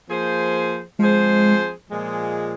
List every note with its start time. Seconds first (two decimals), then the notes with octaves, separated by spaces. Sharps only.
0.09 F3 A#3 G#4 C5
0.99 F3 G#3 C4 G#4 C5
1.90 A#2 F3 G#3